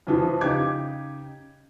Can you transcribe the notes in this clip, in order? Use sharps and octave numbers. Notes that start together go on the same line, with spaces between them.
F2 E3 F3
C#3 D#4 G4 D6 G#6